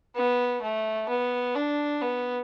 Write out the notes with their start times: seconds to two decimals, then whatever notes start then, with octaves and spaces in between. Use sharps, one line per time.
0.16 B3
0.62 A3
1.09 B3
1.55 D4
2.02 B3